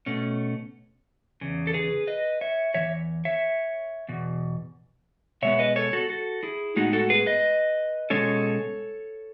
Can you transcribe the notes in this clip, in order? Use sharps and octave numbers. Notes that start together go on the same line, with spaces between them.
B2 A3 C#4
E2 C#3
A4
G#4 B4
B4 D#5
C#5 E5
E2 C#3 E3 C#5 E5
C#5 E5
E2 B2
B2 G#3 B3 C#5 E5
B4 D#5
A4 C#5
F#4 A4
F#4 A4
E4 G#4
A2 G#3 B3 D#4 F#4
F#4 A4
G#4 B4
B4 D#5
B2 G#3 C#4 A4 C#5